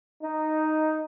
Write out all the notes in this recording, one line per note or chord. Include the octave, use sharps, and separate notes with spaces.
D#4